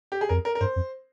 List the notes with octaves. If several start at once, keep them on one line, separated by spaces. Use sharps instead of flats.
G4
G#4
F2 A#4
A#4
A#4
G2 C5
F2